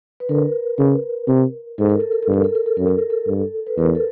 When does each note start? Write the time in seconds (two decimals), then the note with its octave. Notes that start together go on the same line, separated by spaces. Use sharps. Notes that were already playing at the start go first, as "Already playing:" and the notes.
0.20 B4
0.29 D3 A#4
0.79 C#3
1.28 C3
1.79 G#2 A4
1.89 A#4
2.00 A4
2.12 A#4
2.23 A4
2.28 G2
2.34 A#4
2.44 A4
2.55 A#4
2.66 A4
2.77 F#2 A#4
2.88 A4
2.99 A#4
3.10 A4
3.28 G2
3.67 B4
3.78 E2 A#4
3.95 A4